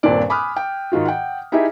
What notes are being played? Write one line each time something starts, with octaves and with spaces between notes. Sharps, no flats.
D#1 G2 A#2 C4 D4 D5
G#5 B5 D6 D#6 F6 F#6
G5
G#2 D#3 F4 F#4
F#5 G5
D#4 E4 G4 G#4 E5